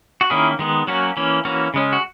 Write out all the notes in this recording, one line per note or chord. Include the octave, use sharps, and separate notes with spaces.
F#4
D#3 A#3 C#4 E4 G#4
D#3 G#3 B3
F#3 A#3 C#4 F#4
E3 A#3 C#4
E3 A#3 C#4 F#4
C#3 G#3 C#4
F#4